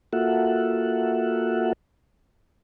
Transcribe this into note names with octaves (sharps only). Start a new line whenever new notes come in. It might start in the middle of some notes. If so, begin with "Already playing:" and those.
A#3 F4 F#4 A4 E5 F#5